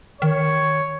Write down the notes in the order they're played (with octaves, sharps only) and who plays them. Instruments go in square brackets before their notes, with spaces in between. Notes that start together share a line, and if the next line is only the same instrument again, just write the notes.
[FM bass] D#3 [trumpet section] C#5